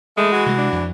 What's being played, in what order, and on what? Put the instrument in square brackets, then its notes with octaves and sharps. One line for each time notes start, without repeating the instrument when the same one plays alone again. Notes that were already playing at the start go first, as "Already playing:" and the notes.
[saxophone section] E3 A3 [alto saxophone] G#3
[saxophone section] E3 F#4
[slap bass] C3 G#3
[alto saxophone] D4
[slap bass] F2